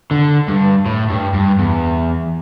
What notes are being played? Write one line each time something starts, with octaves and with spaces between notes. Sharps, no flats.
D3
G2
A2
G2
G2
E2